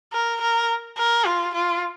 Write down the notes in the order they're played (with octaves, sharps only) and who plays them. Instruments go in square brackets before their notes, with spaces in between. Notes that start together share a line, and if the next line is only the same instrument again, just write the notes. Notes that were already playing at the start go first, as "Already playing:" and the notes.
[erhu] A#4
A#4
A#4
F4
F4